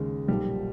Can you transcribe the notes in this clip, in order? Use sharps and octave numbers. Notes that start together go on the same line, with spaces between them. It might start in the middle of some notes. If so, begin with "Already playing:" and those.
Already playing: D#2 C#3 F3 G#3
B1 A#2 F3 G3